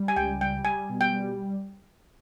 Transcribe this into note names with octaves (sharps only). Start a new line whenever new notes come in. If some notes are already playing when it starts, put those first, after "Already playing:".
Already playing: G3
G#5
C#2 G5
G3 G5
G3 G#5
B2
G5
G3